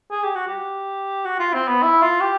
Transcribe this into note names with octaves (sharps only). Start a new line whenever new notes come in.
G#4
G4
F#4
G4
F#4
F4
C4
B3
E4
F4
G4